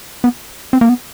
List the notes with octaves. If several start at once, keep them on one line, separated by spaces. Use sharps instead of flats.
B3
C4
A#3
B3